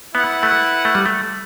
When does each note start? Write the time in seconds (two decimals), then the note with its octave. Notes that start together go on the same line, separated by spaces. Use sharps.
0.15 B3 E4 B4 F#5
0.43 A3
0.85 A3
0.95 G3
1.06 A3